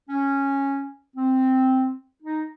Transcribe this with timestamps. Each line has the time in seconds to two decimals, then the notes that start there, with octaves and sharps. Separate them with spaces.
0.09 C#4
1.16 C4
2.23 D#4